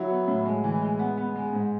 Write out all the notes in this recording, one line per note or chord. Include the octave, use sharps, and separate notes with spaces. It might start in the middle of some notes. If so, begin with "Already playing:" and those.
Already playing: F#3 E4
B3
A2
G#3
E3
G#3
B3
B3
G#3
G#2